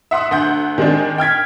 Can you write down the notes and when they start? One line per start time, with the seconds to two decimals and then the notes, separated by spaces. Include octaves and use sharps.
0.11 E5 F#5 C6 D#6
0.31 D2 F#5 G6
0.78 D#3 G#3 C4 D4
1.18 G5 F6 G#6 B6